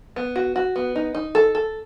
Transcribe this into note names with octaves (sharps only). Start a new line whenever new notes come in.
B3
F#4
F#4
B3
D#4
D#4
A4
A4